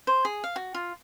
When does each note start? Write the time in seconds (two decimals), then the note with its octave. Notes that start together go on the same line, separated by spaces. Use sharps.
0.07 C5
0.25 G#4
0.44 F5
0.56 F#4
0.74 F4